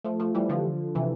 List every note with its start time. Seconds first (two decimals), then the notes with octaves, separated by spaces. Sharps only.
0.04 F3 A3
0.20 F3 A3
0.35 E3 G3
0.49 D3 F3
0.95 C3 E3